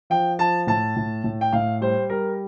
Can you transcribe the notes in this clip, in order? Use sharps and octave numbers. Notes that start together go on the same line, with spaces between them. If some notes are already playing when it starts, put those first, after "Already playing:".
F3 G5
F3 A5
A2 A5
A2
A2
G5
A2 F5
G3 C5
G3 A#4